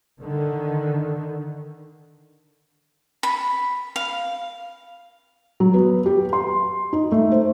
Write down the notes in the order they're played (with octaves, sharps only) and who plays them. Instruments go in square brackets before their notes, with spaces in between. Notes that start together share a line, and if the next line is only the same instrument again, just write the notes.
[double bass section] D3 D#3
[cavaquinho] B5
F5
[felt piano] F#3
B3
G4
C6
D#4
A3
C5